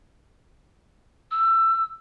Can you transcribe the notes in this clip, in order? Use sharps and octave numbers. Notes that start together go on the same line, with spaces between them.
E6